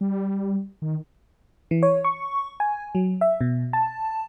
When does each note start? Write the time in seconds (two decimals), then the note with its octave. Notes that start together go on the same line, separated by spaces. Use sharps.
0.01 G3
0.82 D#3
1.71 E3
1.83 C#5
2.04 C#6
2.60 G#5
2.95 F#3
3.21 E5
3.41 B2
3.73 A5